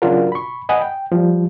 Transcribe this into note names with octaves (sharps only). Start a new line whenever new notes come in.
C#3 F#3 D4 F4 F#4 A#4
B5 C#6
D#5 F#5 G#5 B5 D#6
G5
F3 G3